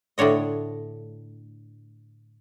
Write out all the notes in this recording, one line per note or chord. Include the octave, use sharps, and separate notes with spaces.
A2 D3 D4 C#5 D#5